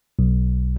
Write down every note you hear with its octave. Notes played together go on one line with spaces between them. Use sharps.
B1